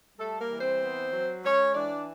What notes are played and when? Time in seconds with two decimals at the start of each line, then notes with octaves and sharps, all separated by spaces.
0.18 G3 A3 A4
0.39 A#3 A#4
0.50 E3
0.60 C4 C5
0.81 B3
1.12 F#3
1.43 G#3 C#4 C#5
1.74 E3 D4 D5